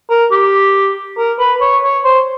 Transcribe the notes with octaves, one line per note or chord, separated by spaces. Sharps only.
A#4
G4
A#4
B4
C#5
C#5
C5